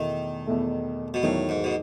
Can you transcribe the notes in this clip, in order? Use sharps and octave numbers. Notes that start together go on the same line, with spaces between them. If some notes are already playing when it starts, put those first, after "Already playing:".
Already playing: E2 B2 D#3 A3 E4
E2 B2 A3 E4
B2
E2 A2 D#3 F#3 A3 D#4
G#2
B2